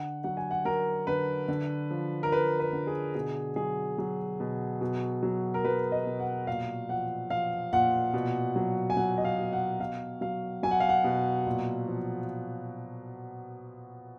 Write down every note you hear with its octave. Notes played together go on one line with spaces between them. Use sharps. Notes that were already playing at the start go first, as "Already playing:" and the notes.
Already playing: D3 F#5
F#3 F#5
G#5
F#5
F#3 A#4
D3 B4
D3
F3
A#4
F3 B4
B4
D3
G#4
B2 G#4
F#3 G#4
F#3
B2
B2
F#3
A#4
F#3 B4
D#5
B2
F#5
A#2 F5
F3 F#5
F3 F5
A#2 F#5
B2
F#3
G#5
F#3 F#5
D#5
F5
B2
F#5
B2 F5
F#3 F5
F#3 G#5
F#5
F5
F#5
B2
A#2
F3